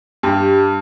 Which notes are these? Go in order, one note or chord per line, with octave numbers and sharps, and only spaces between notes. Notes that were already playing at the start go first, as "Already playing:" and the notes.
G2 G4